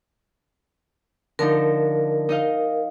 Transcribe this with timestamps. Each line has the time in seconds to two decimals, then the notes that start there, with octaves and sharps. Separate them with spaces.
1.39 D3 F3 D#4 A#4
2.29 D#4 D#5 F5